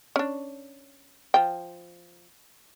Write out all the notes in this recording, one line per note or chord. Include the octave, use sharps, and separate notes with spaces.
C#4 D4
F3 G5